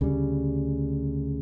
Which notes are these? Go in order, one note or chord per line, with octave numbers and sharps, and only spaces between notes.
D2 C#3 G3